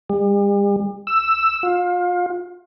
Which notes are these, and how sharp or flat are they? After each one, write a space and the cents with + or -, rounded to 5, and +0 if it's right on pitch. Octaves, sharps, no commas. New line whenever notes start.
G3 +45
E6 +5
F4 +30